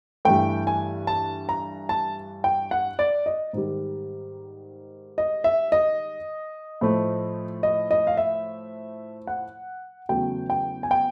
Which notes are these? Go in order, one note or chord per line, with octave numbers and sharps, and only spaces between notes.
G2 E3 A3 G5
G#5
A5
A#5
A5
G5
F#5
D5
D#5
G#2 D#3 G3
D#5
E5
D#5
A2 F3 A3
D#5
D#5
F5
E5
F#5
E2 C#3 F#3 A3 G5
G5
G#5
G5